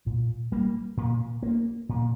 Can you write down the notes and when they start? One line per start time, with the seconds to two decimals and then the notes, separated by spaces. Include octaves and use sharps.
0.06 A#2
0.52 G3 A#3
0.97 A#2
1.43 A#3
1.89 A#2